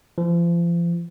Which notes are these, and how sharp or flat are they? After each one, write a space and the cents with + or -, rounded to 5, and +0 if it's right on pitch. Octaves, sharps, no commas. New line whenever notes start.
F3 -35